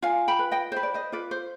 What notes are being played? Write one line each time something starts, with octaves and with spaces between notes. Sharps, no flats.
F4 F5 G#5
G5 B5
B4
D#5 G5
B4 C5
D5
C5 D#5
F4 B4 D5
C5